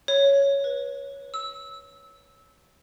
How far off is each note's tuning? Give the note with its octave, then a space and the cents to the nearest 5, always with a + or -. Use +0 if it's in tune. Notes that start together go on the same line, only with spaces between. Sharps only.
C#5 +5
B4 -15
E6 -20